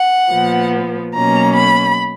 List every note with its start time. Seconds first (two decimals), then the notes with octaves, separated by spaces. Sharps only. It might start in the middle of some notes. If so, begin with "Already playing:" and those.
Already playing: F#5
0.30 A#2 F3 B3
1.15 B2 F#3 A#3 C#4 A#5
1.56 B5